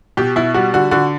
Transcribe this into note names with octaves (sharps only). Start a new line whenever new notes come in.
B2 G4
B2 E4
G3 F#4
D3 F#4
D3 F#4